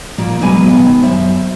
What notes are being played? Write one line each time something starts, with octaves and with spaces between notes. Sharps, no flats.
A#2 F3 A#3 F4
E2 B2 F#3 G#3 B4 G#5
D#3
F#2 C5 E5